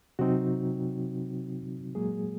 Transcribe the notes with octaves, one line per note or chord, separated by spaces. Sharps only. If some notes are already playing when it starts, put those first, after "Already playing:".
C3 F#3 C4 D#4 F#4
A#2 F#3 G#3 A#3 G#4